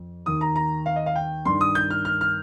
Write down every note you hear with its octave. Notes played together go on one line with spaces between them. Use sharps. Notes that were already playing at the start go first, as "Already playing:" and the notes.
Already playing: F2
D#2 D#3 D#6
A#5
A#5
F5
D#5
F5
G5
G2 D#3 C6
D#6
G6
F6
F6
F6